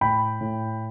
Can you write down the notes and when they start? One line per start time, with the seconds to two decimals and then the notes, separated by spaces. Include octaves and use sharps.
0.01 A2 G5 B5
0.41 A2